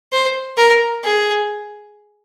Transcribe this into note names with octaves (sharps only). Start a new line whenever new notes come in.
C5
A#4
G#4